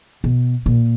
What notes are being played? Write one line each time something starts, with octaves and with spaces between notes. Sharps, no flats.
B2
A#2